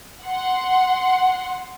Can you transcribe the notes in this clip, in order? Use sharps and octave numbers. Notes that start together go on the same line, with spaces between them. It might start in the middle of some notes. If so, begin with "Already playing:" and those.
F#5 C6